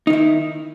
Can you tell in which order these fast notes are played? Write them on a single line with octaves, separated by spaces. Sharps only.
D#4 D#3 E4